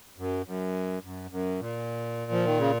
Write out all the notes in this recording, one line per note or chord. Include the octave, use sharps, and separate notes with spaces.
F#2
F#2
F#2
F#2
A#2
F3
D#3
C#3